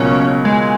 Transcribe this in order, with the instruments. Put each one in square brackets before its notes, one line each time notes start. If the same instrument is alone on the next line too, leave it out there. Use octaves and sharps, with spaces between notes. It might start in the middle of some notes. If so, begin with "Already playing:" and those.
Already playing: [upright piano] C#2 B2 F#3 A#3 F4 [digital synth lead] C#4
[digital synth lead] G#3